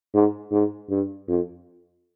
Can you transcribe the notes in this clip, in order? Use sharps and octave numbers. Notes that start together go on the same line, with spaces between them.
G#2
G#2
G2
F2